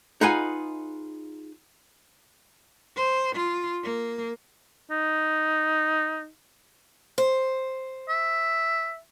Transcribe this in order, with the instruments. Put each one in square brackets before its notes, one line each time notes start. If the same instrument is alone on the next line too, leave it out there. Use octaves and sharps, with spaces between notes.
[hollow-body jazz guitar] D#4 F4 G#4 B4 F#5 G#5
[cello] C5
F4
A#3
[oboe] D#4
[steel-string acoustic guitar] C5
[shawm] E5